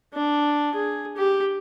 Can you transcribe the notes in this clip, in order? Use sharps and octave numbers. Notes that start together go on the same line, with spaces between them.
D4
G#4
G4